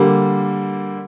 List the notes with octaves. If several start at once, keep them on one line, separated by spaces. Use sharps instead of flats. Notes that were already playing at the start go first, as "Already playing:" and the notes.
Already playing: D3 G3 A#3